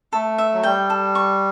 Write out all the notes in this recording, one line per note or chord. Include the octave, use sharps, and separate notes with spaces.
A3 A4
E5
F#3
G3 G5
A4
C#6